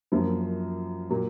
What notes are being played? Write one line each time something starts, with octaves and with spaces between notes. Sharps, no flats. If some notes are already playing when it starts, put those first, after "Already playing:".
F#2 F3 A#3 F4
A#2 F#3 A#3